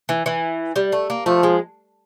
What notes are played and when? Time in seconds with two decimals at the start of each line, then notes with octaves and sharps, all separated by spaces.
0.09 E3
0.26 E3
0.76 G3
0.92 A3
1.10 A#3
1.26 F3 A3
1.43 G#3